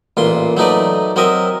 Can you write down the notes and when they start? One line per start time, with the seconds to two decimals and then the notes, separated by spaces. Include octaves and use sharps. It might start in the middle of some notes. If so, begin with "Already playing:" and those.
0.17 A1 A#2 C6
0.57 F#3 A3 D#4 B4 D5
1.16 F#3 C4 A#4 D#5 E5